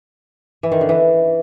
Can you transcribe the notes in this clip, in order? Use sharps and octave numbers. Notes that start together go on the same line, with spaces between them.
E3
D#3
D3
E3